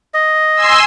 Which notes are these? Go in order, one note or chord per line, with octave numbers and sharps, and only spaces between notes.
D#5
G#5 C6 E6